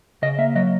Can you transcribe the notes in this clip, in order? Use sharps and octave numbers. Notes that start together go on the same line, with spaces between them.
C#3 D#5
A#3 E5
F#3 D#5